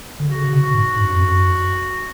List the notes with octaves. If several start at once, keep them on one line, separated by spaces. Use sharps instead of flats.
D3
C#3 F#4
C#3
B2
G#2
G#2
F#2
F2
F#2